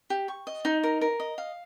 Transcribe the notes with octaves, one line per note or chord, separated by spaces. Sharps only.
G4
C#6
D#5
D#4
A#4
A#4
D#5
F5